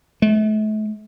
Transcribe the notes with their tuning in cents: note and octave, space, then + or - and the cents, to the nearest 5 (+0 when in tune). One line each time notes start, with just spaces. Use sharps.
A3 -40